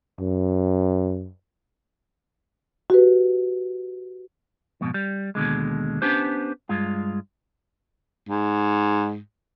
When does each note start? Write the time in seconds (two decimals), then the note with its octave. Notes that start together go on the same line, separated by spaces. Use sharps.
0.20 F#2
2.90 F#4 G4 B4
4.81 F2 G#2 B2
4.94 G3
5.35 D#2 B2 D3 G#3
6.02 B3 C#4 D4 G4 C5
6.69 G2 G#3 F4
8.29 G#2